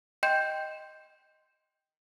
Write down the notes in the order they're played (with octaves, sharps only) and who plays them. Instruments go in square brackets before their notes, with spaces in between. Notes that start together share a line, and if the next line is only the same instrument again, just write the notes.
[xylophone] D#5 G5 C6 G6 E7